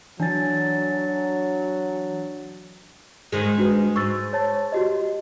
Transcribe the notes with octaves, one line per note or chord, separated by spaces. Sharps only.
E3 F#3 D4 G#5 A6
G#2 D#3 G#3
D4 F#4 B4
G#2 C#6 E6 A6
C#5 A5 A6
F#4 G4 D#5